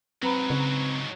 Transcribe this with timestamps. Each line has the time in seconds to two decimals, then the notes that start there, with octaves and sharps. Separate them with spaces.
0.23 G#2 F#3 C4 B4 A#5 B5
0.50 C#3